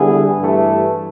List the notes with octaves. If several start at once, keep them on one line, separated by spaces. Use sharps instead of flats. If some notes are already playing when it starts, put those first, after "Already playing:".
Already playing: D3 G3 B3 E4 G#4
G2 E3 A3